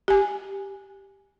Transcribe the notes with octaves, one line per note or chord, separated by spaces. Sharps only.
G4 G#5